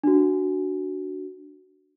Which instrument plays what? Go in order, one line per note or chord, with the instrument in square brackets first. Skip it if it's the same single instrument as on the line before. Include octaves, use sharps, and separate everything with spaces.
[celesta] D4 F#4